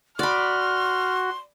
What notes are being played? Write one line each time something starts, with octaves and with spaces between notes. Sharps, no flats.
F#4 D5 B5 C6 F6